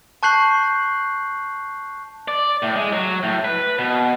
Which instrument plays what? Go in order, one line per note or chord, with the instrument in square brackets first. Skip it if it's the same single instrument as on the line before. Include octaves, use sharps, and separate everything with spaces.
[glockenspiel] A5 C#6 F#6 G6 C7 F#7
[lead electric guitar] D5
A2
G#3
F#3
A2
B4
B2